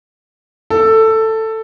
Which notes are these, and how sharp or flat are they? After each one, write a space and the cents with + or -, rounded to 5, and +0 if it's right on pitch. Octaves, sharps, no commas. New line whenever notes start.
A4 +10